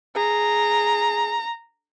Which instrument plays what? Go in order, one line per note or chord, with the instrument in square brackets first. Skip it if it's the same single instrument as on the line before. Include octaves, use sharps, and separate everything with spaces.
[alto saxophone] G#4 [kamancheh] A#5